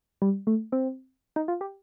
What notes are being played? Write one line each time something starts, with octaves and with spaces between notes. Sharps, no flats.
G3
A3
C4
D#4
F4
G4